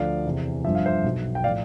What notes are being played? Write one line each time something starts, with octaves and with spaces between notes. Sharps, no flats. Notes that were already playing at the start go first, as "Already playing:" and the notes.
Already playing: D2 D3 F3 D5 F5
E2 C3 E3
G1 G2 D3 F3 E5
F5
C5 E5
B1 B2
G5
A2 F3 D5 F5